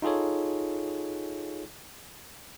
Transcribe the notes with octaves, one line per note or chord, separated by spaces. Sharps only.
D#4 F4 G#4 A4 C#5